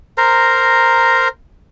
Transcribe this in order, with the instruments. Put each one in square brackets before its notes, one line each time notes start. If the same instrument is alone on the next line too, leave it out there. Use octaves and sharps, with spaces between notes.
[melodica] A#4 C5 A#5